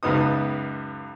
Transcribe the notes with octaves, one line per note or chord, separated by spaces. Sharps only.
C#2 F#2 B3 D#4 D#6